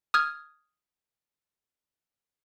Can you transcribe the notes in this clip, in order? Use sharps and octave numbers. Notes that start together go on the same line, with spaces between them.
D#6 F6 G#6